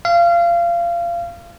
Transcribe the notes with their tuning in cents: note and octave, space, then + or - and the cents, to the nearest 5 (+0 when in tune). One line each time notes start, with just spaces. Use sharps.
F5 -25